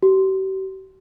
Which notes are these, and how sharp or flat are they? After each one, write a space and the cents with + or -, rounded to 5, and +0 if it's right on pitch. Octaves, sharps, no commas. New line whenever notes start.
G4 -45